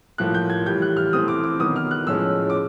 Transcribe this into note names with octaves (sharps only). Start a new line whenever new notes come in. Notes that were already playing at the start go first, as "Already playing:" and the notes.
A2 F3 A#3 F#6
G6
G#6
A2 E3 G3 G6
F#6
F6
E3 A3 C4 D#6
D6
D6
D#3 F#3 B3 D#6
F6
F#6
A2 F3 G#3 C#4 E6
D6